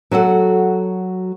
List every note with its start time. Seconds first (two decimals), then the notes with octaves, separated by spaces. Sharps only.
0.11 F#3 F#4 A4 F#5